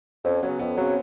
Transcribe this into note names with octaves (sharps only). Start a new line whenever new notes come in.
F2 C#4
C#3 F#3 B3
F2 B3
C#3 F#3 C4